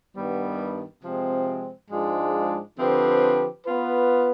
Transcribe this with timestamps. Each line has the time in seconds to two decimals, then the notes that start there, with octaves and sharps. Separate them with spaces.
0.15 G2 D#3 G3 B3
1.03 C3 F3 G#3 C4
1.90 G#2 F3 G#3 D4 F4
2.78 D3 F3 C4 G4 B4
3.65 B3 F4 B4